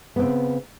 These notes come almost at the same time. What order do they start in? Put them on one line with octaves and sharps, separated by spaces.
B3 C4 C#3